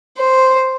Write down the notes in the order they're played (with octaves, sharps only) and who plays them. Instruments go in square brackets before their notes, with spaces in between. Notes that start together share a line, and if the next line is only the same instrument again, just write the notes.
[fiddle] C5